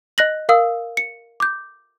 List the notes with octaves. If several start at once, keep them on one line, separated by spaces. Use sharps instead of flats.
D#5 F#6 A#6 F#7
A#4 F5 D#6 E6
C#7
D6 G6